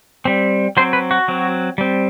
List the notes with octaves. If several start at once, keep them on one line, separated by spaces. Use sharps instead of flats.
G3 C4
F#3 C4 C5
B4
F#4
F#3 C4
G3 C4